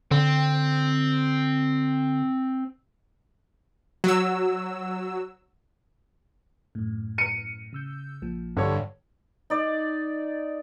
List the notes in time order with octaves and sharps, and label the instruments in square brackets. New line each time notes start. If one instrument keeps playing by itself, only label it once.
[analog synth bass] D3 [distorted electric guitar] C4
[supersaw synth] F#3 E6
[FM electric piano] F#2 A2
[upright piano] C#7 D#7
[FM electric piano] C#3 E6 G6
A#1 A#2 F3
[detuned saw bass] G2 [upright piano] D3 C#5
[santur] D#4 D5